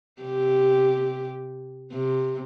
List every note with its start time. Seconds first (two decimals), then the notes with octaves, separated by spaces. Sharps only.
0.21 C3 G4
1.92 C3